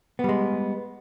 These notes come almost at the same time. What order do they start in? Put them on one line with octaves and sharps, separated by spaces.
B3 G3 G#3